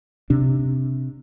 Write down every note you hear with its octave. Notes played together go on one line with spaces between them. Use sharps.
C3 D4